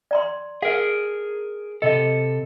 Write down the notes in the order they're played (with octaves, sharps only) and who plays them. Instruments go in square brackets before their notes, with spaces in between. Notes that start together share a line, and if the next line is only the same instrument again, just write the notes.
[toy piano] D5 A#5 C6
[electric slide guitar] G#4 A#4 [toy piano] F5
[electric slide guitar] C3 A4 [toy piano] D#5